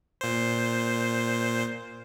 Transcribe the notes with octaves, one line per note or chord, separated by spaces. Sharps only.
A#2 C5